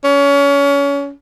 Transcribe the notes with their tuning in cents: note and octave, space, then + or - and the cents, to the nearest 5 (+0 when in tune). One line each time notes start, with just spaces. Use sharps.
C#4 +25